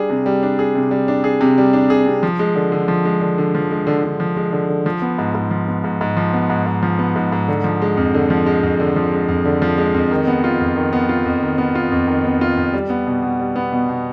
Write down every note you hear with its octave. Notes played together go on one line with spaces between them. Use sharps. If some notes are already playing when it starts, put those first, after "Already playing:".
Already playing: G3 D4 G#4
C3
G3
D4
G#4
C3
G3
D4
G#4
C3
G3
D4
G#4
C3
F3
G#3
D3
D3
F3
G#3
D3
D3
F3
G#3
D3
D3
F3
G#3
D3
D3
F3
B3
G#2
G#2
F3
B3
G#2
G#2
F3
B3
G#2
G#2
F3
B3
G#2
G#2
D3
F3
G#3
F2
D3
F3
G#3
F2
D3
F3
G#3
F2
D3
F3
G#3
F2
D#3
B3
F4
F2
D#3
B3
F4
F2
D#3
B3
F4
F2
D#3
B3
F4
F2
G3
B3
B2
B2
G3
B3
B2
B2